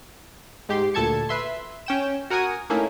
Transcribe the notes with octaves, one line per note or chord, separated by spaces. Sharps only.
G#2 G4 C6
D2 A#2 A4 A5 G#6 C#7
B4 E5 C6
C#4 G5 E7
F#4 A#4 F#5 G#5 D#6
A3 A#3 C#4 D#4 E4